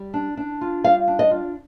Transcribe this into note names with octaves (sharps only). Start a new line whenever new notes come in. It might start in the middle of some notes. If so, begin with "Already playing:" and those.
Already playing: G3
D4
D4
F4
G3 F5
D4
D#5
F4